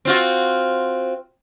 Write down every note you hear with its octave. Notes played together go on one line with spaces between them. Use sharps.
C4 F4 F#4